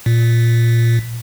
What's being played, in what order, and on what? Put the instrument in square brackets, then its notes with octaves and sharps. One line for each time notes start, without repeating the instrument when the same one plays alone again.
[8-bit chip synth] A#2